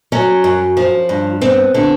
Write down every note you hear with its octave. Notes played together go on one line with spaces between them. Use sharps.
F#3 C#4
F#2
F3
G2
B3 C4
D3